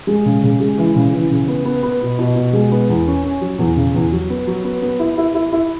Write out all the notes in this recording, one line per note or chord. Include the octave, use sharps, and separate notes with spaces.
G#3
C#3
C#3
G#3
E3
C#3
E3
C#3
B3
B3
B3
B2
B2
B2
G#3
B3
E2
C#4
C#4
F#3
E2
C#3
E2
F#3
B3
F#3
B3
B3
E4
E4
E4
E4